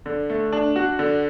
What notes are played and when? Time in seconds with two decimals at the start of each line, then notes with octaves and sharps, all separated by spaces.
0.06 D3
0.30 A3
0.53 D4
0.76 F#4
0.99 D3